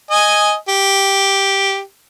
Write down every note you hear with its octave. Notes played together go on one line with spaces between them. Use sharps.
D#5 G#5
G4